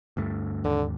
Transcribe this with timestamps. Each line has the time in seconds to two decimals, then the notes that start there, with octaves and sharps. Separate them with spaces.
0.17 D2 G2 A3
0.64 D#2 G#2 D3